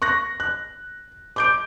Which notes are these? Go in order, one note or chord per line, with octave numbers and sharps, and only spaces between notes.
C#6 F#6 A#6
F#6
D6 G6 D7